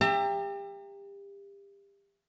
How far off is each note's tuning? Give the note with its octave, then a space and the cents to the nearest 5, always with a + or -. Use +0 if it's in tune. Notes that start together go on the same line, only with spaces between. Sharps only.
G4 +30 E5 +25 A#5 -40